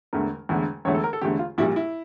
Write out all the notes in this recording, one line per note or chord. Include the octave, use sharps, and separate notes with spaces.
E1 E2 D3 A3 A#4
E1 E2 D3 A3
E1 E2 D3 A3 C#5
A4
A#4
A4
E1 E2 D3 A3 G4
F4
A#1 A#2 G3 E4
E4